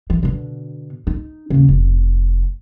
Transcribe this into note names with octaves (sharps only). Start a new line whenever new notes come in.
E3
B2 D3
D#4
D#2 C#3
F1